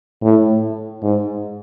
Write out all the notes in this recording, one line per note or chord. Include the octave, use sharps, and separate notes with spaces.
A2
G#2